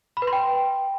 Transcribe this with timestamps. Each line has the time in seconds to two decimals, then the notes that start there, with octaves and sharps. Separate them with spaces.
0.17 B5
0.22 B4
0.27 C6
0.33 G5